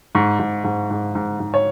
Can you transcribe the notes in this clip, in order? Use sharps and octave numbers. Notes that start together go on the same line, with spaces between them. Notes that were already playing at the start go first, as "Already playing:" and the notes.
G#2 C#6
G#2
G#2
G#2
G#2
G#2
C#5